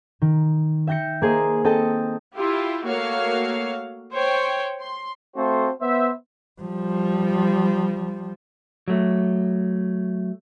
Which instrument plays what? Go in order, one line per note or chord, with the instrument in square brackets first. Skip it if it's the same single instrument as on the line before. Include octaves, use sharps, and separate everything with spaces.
[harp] D#3
E5 G5 G6 A#6 C#7
A#3 G#4 C5 D#5
C4 A4 D#5 G5 A5
[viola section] E4 F4 G4
A3 A#3 F#4 C#5 F5
C5 C#5 G5
C6
[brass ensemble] A3 C4 F4 F#4 A4 C5
B3 C5 E5
[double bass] F3 G3
[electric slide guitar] F#3 A3